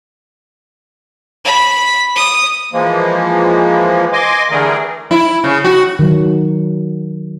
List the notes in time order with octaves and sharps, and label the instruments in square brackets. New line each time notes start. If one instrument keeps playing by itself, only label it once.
[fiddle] B5
D#6
[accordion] E3 F3 G#3 A#3
D#5 G#5 C6 D6
D3 E3 G3 A3 G#4 A#4
[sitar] E4
C#3
F#4
[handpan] D#3 F#3